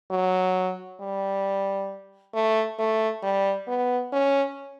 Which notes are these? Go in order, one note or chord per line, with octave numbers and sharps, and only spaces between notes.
F#3
G3
A3
A3
G3
B3
C#4